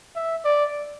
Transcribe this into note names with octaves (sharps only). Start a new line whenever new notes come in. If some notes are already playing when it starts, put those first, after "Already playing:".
E5
D5